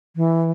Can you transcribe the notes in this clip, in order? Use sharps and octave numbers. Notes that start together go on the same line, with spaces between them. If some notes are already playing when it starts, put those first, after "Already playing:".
E3